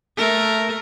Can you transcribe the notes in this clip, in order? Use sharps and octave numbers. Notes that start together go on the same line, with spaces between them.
A3 A#4